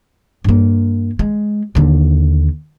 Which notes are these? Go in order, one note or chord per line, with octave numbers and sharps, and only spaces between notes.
G2 A#3
G#3
D#2 D3